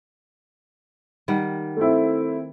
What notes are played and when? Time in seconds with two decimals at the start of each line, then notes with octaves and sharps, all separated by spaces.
1.28 D#3 G3 F#5
1.77 A3 C4 E4